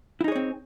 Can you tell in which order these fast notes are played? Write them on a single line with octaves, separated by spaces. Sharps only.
E4 D#4 G#4 C#5 C4